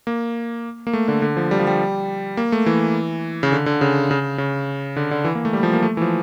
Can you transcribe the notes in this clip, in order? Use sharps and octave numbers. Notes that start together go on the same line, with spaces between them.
A#3
A#3
A3
D3
D3
F3
G3
F3
G3
A#3
A3
E3
C#3
D3
D3
C#3
C#3
C#3
D3
D3
E3
A#3
A3
G3
F3
A#3
A3
E3
F3